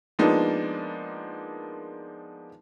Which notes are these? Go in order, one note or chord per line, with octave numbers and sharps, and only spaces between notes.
F3 G#3 A#3 B3 D4 D#4